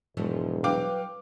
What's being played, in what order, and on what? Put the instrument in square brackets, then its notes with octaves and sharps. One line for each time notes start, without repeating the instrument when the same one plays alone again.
[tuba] E1 [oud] G#2 F3 F#3
[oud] F#3 [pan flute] B4 [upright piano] F5 G5 D6